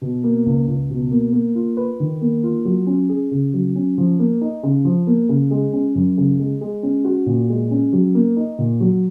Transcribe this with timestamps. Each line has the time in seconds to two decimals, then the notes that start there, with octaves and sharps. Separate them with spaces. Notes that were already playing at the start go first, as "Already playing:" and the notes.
0.02 B2
0.24 A#3
0.46 C#2
0.68 C#2
0.90 B2
1.11 A#3
1.33 A#3
1.55 F4
1.77 B4
2.00 D#3
2.21 A#3
2.44 F4
2.65 F#3
2.87 C#4
3.09 G#4
3.31 C#3
3.54 F#3
3.76 C#4
3.98 F3
4.19 A#3
4.41 D#4
4.63 C#3
4.85 F3
5.07 A#3
5.29 C#3
5.51 G#3
5.73 C#4
5.95 F#2
6.17 C#3
6.39 G#3
6.61 G#3
6.83 C#4
7.05 F#4
7.26 A#2
7.49 G#3
7.71 C#4
7.93 F#3
8.15 A#3
8.37 D#4
8.58 A#2
8.80 F#3